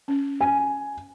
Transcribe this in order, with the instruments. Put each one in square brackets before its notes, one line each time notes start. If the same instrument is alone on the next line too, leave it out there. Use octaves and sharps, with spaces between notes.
[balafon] C#4
[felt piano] G#5